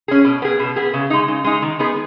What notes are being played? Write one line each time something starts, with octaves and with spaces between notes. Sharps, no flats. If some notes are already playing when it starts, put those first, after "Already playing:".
C#4 G#4
B2
B3 G#4
B2
B3 G#4
C#3
G#3 D#4
C#3
G#3 D#4
D#3
G#3 B3 D#4 G#4